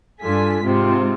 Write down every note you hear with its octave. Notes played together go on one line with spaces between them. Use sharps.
G2 D4 F4 A4 G#5 B6
G#2 C3 G#3 C4 F4